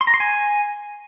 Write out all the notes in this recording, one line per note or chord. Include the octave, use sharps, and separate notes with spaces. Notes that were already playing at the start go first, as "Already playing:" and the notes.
C6
A#5
C6
G#5